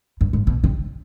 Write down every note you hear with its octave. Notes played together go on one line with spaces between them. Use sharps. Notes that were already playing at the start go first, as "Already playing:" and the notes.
G2
G#2
B2
C3